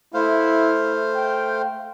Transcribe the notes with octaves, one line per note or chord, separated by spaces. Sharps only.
A3 E4 C5 F5
G5